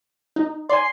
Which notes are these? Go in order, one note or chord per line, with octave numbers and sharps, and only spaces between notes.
D#4
D5 G#5 C6